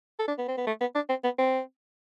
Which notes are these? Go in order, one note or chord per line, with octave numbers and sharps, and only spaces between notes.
A4
D4
B3
C4
B3
A3
B3
D4
C4
B3
C4